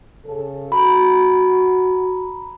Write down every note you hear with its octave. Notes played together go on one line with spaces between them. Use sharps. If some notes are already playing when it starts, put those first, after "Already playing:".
C#3 A4
F#4 A#5 B5